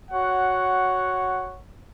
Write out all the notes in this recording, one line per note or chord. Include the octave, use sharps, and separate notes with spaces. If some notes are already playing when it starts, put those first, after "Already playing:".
F#4 C#5 F#5